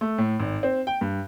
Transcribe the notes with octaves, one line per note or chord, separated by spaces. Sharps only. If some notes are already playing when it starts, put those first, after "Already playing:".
A3
A2
G#1
C4
G5
G2